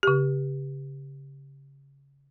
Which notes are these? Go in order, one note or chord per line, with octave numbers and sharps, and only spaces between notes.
C#3 G4